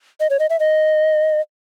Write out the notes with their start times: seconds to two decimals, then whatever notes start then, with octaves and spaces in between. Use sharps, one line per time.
0.20 D#5
0.30 C#5
0.39 D#5
0.50 E5
0.60 D#5